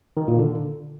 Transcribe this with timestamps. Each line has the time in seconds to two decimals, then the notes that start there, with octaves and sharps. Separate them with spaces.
0.17 D#3
0.28 A#2
0.39 D3